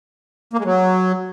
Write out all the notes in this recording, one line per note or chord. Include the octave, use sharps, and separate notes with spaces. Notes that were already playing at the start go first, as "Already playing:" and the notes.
A#3
G#3
F#3